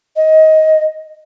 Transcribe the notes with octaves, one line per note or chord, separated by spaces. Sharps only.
D#5